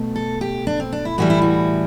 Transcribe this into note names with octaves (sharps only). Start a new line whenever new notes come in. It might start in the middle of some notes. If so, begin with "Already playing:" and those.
Already playing: B2 A3
A4
G4
D4
C4
D4
E4
A2 E3 G3 F#4
E4
F#4